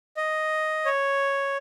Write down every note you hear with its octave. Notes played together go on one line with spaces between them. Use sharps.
D#5
C#5